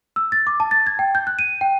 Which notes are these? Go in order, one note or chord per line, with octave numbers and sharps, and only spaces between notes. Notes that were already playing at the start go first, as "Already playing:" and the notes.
E6
A6
D6
A5
A6
G#6
G5
G6
F#6
D#7
G5